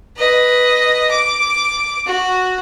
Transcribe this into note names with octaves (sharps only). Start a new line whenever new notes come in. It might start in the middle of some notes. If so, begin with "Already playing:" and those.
B4 D#5
D6
F#4